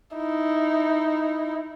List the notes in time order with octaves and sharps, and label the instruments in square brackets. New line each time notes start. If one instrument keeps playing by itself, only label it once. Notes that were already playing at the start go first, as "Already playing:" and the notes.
[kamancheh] D#4 E4